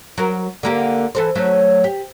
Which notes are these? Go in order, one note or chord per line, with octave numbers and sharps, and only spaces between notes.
F#3 A#4
D3 A#3 G4
E3 A4 C5
F#3 A3 C#4
G4